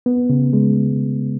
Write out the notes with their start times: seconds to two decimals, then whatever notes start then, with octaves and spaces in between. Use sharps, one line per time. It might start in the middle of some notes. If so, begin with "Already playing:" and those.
0.06 B3
0.30 C#3
0.53 G#3